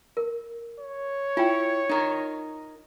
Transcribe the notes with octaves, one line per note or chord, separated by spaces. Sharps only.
A#4
C#5
E4 F4 G5
D#4 A#4